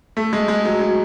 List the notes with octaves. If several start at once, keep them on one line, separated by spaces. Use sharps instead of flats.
A3
G#3
G#3
F#3
F#3